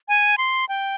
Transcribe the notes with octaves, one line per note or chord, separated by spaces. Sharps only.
G#5
C6
G5